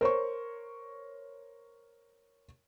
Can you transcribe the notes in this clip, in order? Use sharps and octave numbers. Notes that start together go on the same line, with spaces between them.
A#4 C5 C#5 C#6